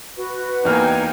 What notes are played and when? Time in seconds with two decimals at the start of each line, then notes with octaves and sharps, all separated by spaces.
0.17 F#4 B4
0.65 E2 A#3 D#4 G5 G#5 F6